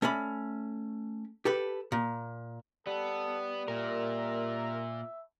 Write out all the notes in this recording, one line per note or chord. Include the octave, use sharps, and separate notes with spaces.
A3 C#4 D5 B5
G4 A4 B4
A#2
G3 B3 A4
A#2 A#4 E5